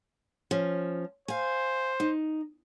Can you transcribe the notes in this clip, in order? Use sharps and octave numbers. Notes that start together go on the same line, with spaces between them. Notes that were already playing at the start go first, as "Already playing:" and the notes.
F3 C#4
C5 F5 G#5
D#4